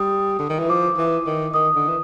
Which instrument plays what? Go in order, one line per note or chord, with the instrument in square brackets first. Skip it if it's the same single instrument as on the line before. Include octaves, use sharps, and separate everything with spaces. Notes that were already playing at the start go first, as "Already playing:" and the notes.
Already playing: [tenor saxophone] G3 [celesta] D#6
[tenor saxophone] D3
D#3
E3
[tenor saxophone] F3 [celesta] D6
[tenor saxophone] E3
D#3
[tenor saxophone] D#3 [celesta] D#6
[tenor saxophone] D3
E3